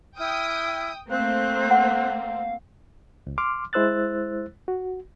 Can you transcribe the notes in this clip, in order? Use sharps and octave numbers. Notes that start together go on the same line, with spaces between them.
E4 G5 D#6 F6
A3 A#3 C4 C5 F5 F#6
F#5
C#2
C6 D6 F6
G#3 E4 C5 E6 F#6 A6
F#4